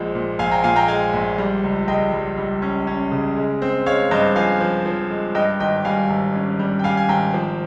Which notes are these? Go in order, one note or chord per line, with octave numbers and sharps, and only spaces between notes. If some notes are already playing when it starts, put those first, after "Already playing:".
Already playing: A#1 F3 G#3
A#2
A#1 F5 G#5
G5 A#5
A#2 F5 G#5
G5 A#5
G#3 F5 G#5
A#1
G3
C#2
C#2 D#5 G5
G3
G3
C#4
C#4
C#3
G#3
C4
G#3 C#5 F5
G2 C5 D#5
F3 F5 G#5
F3
F3
G#3
G2 D#5 G5
G#1 D#5 G5
G3 F5 G#5
G#1
C#4
G3
G5
G3 F5 G#5
G#5
G#1 G5 A#5
F3